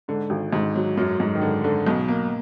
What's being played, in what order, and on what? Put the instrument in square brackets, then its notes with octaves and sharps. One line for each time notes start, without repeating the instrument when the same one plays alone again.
[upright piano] G#2 [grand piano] D3
[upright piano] G#1
[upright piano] G#1 [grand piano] G#2
[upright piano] F#3
[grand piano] F#2 [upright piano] F#3
[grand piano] G#2 [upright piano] F#3
[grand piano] D#3
[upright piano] G#2 [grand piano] D3
[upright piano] G#2 [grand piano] D3
[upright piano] B1 [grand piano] B2
[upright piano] A#3